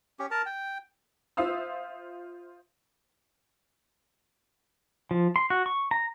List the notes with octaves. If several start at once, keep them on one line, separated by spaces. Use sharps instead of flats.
C#4 G4
A#4 A5
G5
F4 C5 E5 F5 D#6 E6
F3
C6
F#4
C#6
A#5